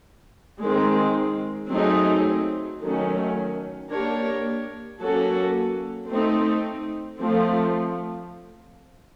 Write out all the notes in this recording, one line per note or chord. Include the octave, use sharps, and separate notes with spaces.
D#3 G#3 C4
F#3 A3 C4 D#4 G#4
D#3 F#3 A3 C#4
A#3 D4 G4 A#4 C#5
F#3 A#3 C#4 F#4 A4
A3 C4 D#4
F3 A3 C4